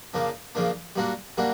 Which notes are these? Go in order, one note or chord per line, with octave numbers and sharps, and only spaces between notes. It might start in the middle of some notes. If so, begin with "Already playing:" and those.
C#3 F3 A#3 D4
C#3 F3 A#3 D4
G3 A#3 D4 F#4
G3 A#3 D4 F#4